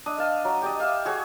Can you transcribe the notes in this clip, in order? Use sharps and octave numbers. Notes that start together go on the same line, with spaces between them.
D4 D#5
F5 A5
F#3
G4 D5 D#5
E5 F5
F#4 G#4 C#5